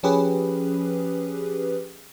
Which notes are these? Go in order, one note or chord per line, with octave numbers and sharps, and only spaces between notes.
F3 C#4 G4 G#4 B4